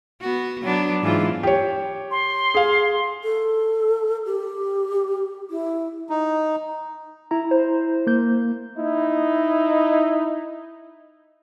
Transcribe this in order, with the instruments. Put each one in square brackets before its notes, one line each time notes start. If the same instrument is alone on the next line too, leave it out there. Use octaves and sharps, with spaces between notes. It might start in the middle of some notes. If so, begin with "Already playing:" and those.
[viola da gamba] B3 F#4
F#3 B3 D4
G#2 E3 F4
[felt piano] G4 C#5
[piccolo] C6
[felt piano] G#4 F5
[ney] A4
G4
E4
[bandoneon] D#4
[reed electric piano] E4 A#5
[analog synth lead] C5
[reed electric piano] A#3 G6
[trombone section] D#4 E4